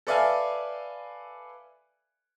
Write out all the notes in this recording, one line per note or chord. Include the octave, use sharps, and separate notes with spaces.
A4 B4 D5 E5 F5 G#5